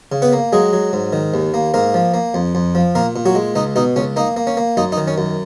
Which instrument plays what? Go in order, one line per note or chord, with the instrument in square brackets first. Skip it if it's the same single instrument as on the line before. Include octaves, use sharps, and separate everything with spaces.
[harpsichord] C#3
B3 B4
A#3
F#3 G#3 G#4
F#3
G#2
D#3
D#2
A#3
G#2 A#3 A#4
F3
A#3
F2
F2
F3
A#2 A#3 A#4
A#2
F#3 F#4
G#3
C#2 D#4
B2 D#4
C#2 C#4
A#3 D#4
A#3
C#4
A#3
F#2 D#4
D#4
D#3
C#4
F#2